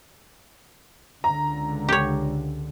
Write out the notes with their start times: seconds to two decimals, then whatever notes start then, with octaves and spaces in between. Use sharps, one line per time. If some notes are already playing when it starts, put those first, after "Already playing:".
1.24 C#2 D3 A#5
1.89 G4 C#5